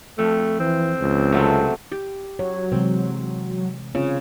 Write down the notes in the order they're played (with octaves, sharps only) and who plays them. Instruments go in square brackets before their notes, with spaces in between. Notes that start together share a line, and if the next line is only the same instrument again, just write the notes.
[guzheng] F2 [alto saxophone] A3
[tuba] E3 [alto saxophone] C4
[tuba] C#2
[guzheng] C3 F#3 A3
[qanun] G4
[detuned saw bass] F#3 [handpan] C#5
[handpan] C3 E3 G#3 [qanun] C4
[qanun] C#3 [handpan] C4 F4 C#5